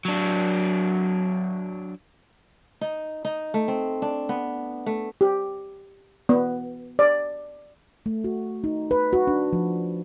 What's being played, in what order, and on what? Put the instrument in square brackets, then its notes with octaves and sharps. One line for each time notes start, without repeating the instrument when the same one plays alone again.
[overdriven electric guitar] F#3 D4
[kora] D#4
D#4
A3
C4
D4
B3
A3
[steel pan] G4
B3
D5
[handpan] A3
F#4
D#4
B4
F#4
D4
F3